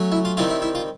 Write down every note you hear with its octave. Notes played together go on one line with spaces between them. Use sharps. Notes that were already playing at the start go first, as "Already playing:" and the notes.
Already playing: F#3 A3 C#4
E4
F4
D#3 G3 C4 E4 F4
E4
E4
F4